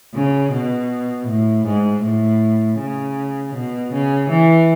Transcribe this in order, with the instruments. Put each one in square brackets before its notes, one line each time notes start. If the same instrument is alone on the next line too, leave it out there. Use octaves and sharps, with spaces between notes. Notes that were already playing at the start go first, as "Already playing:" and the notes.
[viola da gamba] C#3
B2
A2
G#2
A2
C#3
B2
C#3
E3